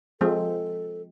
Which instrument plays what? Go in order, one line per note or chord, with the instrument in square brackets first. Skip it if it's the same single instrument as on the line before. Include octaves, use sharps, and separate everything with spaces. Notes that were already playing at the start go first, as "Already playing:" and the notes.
[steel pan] F3 G#3 C4 [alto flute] A4